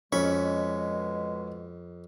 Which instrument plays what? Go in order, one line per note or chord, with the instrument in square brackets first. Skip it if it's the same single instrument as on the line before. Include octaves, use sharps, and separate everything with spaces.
[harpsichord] F2 B5 C#6 [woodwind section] B2 G#3 [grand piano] C#4